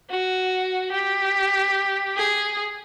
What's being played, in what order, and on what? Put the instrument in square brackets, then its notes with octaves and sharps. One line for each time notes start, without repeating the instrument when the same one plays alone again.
[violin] F#4
G4
G#4